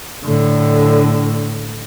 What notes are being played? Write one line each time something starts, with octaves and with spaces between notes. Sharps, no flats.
A2 D3